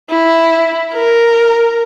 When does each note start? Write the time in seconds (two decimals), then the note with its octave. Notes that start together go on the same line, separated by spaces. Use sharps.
0.10 E4
0.94 A#4